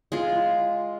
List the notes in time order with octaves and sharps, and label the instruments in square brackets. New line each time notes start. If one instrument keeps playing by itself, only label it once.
[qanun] G#3 F4